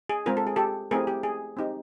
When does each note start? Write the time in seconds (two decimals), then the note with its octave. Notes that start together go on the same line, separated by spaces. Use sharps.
0.09 G#4
0.26 G#3 C4 F4 A#4
0.37 A4
0.47 G#4
0.56 G4 A4
0.91 A3 C4 E4 G4 G#4 A#4
1.07 G4
1.23 G#4
1.57 C4 D#4 G4